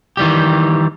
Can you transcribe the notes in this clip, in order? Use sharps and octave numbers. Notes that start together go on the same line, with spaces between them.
D#3 E3 G3 G4